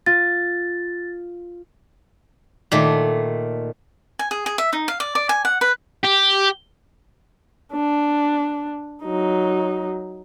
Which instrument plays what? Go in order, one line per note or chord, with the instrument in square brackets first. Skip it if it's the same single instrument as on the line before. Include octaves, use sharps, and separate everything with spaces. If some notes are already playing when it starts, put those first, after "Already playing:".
[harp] F4 [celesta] A6
[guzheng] A#2 D#3 A3
[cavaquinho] G#5
G#4
G#4
E5
D#4
F5
D5
D5
G#5
F#5
B4
[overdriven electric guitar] G4
[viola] D4
F#3 D#4